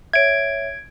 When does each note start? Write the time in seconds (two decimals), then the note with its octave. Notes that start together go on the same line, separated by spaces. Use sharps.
0.13 C#5 E5 G#6 D7